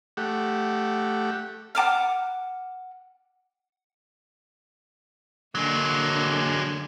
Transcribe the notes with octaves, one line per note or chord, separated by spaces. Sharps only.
A3 G4 F#5
F#5 A5 D6 F6
D3 F#3 G#3 A#3